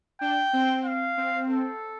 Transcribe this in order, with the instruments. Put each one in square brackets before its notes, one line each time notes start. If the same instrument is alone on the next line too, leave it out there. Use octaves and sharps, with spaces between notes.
[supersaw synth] D4 [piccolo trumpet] G5
[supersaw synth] C4
[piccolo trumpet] F5
[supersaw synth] C4
[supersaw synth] C4 [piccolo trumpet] A4